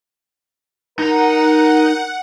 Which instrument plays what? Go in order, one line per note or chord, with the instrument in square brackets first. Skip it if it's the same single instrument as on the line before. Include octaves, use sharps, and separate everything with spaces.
[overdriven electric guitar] D#4 A#5 [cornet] A#4 [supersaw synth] F#5